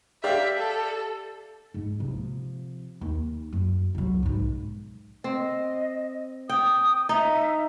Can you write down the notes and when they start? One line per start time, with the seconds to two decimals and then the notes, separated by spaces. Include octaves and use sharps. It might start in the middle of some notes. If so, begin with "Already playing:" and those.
0.24 G4 D5 E5 F5
0.57 A4
1.74 G#2
2.00 C3 F3
3.01 D#2
3.53 F#2
3.95 C2 F#3
4.23 B1 G#2
5.24 C4 D#5
6.49 G5 D#6
7.09 D#4 E5